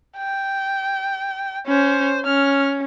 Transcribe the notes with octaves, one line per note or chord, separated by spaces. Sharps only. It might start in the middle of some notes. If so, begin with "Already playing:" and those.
G5
C#4 C5
C#4 F6